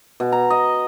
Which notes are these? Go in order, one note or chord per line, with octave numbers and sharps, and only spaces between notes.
B2
A#5
D#5